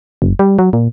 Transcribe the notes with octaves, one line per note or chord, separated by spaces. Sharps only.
F#1
G3
F#3
A#2